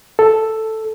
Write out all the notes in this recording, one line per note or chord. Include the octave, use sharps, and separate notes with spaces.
A4